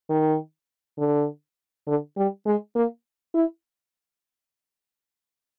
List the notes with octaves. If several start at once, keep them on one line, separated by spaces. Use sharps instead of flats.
D#3
D3
D3
G3
G#3
A#3
E4